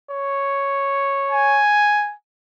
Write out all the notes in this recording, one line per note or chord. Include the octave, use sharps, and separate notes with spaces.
C#5
G#5